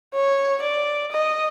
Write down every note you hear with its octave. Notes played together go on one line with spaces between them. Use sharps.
C#5
D5
D#5